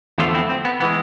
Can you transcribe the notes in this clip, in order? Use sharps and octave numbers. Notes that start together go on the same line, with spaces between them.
E2 D3 F3 A3 D4 F4
C4 E4
C4
B3
E3 G#3 B3